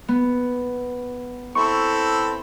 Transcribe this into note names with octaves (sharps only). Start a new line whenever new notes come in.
B3
C4 E4 A4 C#6